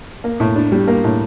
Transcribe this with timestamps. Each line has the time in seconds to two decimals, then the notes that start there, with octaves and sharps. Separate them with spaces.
0.24 A#3
0.40 A2
0.56 D4
0.72 G3
0.88 A#3
1.04 A2